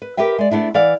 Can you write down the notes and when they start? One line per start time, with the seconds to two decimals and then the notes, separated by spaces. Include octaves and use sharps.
0.02 B4
0.17 G4 A#4 B4 E5 G5
0.38 G#3 D5
0.50 A3 B3 D4 E4 G#4
0.74 E3 D5 F5 F#5